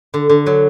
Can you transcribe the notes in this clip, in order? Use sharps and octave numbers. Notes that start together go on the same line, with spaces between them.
D3
D3
F#3